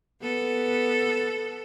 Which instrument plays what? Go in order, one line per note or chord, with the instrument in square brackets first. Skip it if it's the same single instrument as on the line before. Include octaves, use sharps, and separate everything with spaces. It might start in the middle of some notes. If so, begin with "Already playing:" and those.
[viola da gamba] B3 A4